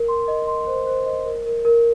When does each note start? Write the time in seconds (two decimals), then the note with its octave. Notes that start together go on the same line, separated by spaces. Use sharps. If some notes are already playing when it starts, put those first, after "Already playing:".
Already playing: A#4
0.08 C6
0.28 D#5
0.47 C6
0.67 C5
0.87 C5
1.06 D#5
1.26 A#4
1.46 A#4
1.65 A#4